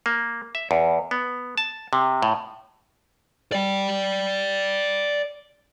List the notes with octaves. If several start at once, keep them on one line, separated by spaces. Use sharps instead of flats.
A#3
E5
E2
B3
A5
C3
A2
D5 G5